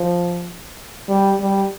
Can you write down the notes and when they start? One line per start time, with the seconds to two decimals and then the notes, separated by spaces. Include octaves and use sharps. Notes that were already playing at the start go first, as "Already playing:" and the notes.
Already playing: F3
1.09 G3
1.40 G3